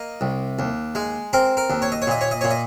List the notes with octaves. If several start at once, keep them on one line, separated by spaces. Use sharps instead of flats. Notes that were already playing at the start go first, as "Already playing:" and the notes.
Already playing: A#3 D#5
C2
D#2
G#3
C4 A#4
A#4
D#2
C#5
D#5
C#5
A#2 D#5
C#5
D#5
A#2 C#5
D#5